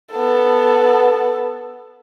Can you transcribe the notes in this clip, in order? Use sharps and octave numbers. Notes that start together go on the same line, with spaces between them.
B3 A4